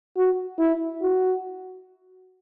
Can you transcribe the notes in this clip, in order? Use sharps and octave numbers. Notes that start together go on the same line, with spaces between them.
F#4
E4
F#4